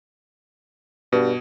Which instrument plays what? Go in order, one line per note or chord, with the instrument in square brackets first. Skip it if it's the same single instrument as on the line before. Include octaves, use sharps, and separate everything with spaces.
[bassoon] G2 [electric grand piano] B2